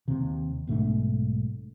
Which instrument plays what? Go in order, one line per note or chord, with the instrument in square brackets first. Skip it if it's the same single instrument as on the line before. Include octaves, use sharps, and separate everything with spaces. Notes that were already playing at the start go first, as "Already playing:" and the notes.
[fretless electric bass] D#2 C3
B1 G#2 A3 D4